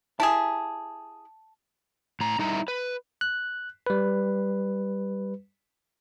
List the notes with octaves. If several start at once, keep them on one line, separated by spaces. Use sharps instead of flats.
E4 G4 G#4 A5
A2 A#5
G3 D#4 E4 E5 A#5
B4
F#6
G3 B4